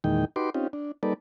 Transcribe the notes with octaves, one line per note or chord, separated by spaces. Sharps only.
E2 A#2 D#3 G#3 D#4 G5
D#4 F#4 G4 B4 C6 D6
C4 C#4 D#4 F4 G4
D4
G3 A#3 D#4 A4 B4 D5